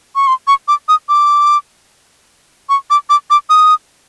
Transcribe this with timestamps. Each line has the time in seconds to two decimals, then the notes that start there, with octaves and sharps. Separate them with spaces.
0.16 C#6
0.27 C6
0.48 C#6
0.68 D6
0.89 D#6
1.09 D6
2.69 C#6
2.90 D6
3.10 D6
3.30 D6
3.50 D#6